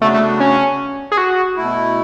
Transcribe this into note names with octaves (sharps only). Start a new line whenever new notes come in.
C#3 F#3 A3 B3 D4 F#4
A3
C#4
G#4
F#4
B2 A3 E4